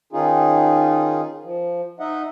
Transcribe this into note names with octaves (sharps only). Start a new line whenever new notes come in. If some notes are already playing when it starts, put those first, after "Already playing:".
D#3 C#4 D#4 F4 G#4
F3
D#4 D#5 E5 F#5